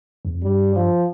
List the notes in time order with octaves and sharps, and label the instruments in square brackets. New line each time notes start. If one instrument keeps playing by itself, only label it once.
[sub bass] E2
F2
[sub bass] G2 [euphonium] G3
[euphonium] F3